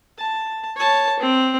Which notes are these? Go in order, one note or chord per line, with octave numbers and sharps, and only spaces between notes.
A5
C#5 A5
C4